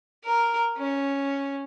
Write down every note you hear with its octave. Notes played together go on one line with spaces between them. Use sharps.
A#4
C#4